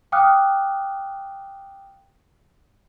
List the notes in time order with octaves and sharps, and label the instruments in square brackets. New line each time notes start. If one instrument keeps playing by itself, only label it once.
[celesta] F5 G5 D6 D#6 F6 F#6